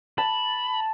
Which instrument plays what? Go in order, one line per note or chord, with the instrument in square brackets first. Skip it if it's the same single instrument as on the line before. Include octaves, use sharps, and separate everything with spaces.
[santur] A5 [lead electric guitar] B5